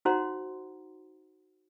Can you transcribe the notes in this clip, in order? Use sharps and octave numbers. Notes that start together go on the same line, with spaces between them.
D#4 F#4 C5 F#5 A#5 C6